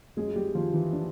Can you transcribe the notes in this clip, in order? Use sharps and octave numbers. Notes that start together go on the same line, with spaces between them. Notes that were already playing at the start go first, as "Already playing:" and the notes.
F#2 G#3 G#4
G3 G4
D#3 F3 G#3 F4
E3 E4
D4